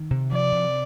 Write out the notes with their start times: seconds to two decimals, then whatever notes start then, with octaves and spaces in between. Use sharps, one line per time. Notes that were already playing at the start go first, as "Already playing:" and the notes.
Already playing: D#3
0.11 C3
0.32 F3 D5
0.52 C3